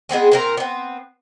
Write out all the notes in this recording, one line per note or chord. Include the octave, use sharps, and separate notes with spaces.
G#3 B3 C4 G#4
A#2 C4 A#4
B3 C4